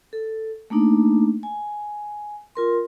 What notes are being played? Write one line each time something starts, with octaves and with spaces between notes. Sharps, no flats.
A4
A3 A#3 D4 D#4
G#5
F4 A#4 C6